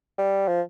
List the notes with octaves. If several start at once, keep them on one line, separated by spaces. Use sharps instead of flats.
G3
F3